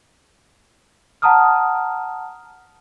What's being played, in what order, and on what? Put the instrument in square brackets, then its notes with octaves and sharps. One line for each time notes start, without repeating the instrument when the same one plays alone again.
[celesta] F#5 A5 A#5 D#6 F6